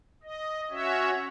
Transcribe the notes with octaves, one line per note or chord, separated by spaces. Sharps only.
D#5
C#4 F#4 C#5 E5